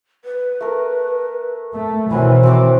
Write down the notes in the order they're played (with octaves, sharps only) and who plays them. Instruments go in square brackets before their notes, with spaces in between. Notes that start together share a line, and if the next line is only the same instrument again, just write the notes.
[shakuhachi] B4
[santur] A3 A#4
[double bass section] A3
[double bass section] B2 D#3 E3 [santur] F#3 C4 E4 [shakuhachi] G#5
[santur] C4 D6 [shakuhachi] F#4